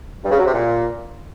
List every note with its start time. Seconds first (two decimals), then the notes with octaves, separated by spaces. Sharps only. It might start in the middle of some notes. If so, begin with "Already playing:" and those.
0.24 G2
0.31 C#3
0.38 F#3
0.46 C3
0.53 A#2